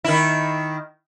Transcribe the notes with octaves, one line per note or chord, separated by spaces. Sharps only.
D#3 E4